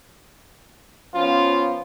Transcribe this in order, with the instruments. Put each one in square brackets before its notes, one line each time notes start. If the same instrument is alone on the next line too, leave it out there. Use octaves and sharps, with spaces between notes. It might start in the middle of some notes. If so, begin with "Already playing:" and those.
[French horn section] F3 B3 C#4 [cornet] F4